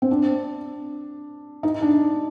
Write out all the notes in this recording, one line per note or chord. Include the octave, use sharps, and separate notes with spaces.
C4
D4
D#4
D4